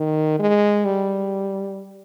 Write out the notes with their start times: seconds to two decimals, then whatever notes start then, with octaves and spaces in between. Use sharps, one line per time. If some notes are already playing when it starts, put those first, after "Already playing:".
Already playing: D#3
0.39 G#3
0.85 G3